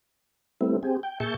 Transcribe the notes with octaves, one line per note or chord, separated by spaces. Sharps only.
G3 A3 B3 C4 E4
C4 G4 G#4
G5
A#2 G#4 E5 A5 C#6 G6